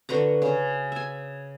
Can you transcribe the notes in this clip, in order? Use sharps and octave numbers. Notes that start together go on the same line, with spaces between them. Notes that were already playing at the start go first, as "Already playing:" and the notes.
D3 F#4 B4 A#5
C#3
E5 G#5